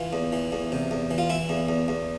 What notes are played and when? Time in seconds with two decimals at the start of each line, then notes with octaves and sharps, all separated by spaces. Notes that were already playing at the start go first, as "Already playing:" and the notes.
Already playing: E3 F4
0.13 E2
0.32 E3
0.52 E2
0.72 C3
0.91 E2
1.11 E3
1.18 F4
1.30 E3 E4
1.49 E2
1.69 E2
1.88 E2